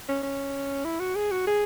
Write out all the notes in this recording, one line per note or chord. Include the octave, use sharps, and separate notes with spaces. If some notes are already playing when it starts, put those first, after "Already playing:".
C#4
C#4
E4
F#4
G#4
F#4
G#4